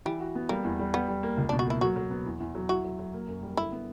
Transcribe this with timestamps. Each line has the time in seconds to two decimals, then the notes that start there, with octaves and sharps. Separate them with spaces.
0.05 E3 G3
0.20 F#4
0.35 B3
0.49 G3 A#3
0.64 E2
0.79 G3
0.94 G3 B3
1.08 G3
1.23 A#3
1.37 C#2
1.49 D4
1.52 B2
1.59 F#4
1.67 A#3 E4
1.81 F#3 F#4
1.96 F#3
2.11 B3
2.26 E2
2.40 E2
2.55 F#3
2.69 E4 F#4
2.84 F#3
2.99 F#3
3.13 A#3
3.28 F#2
3.43 G3
3.57 D3 E4
3.72 B3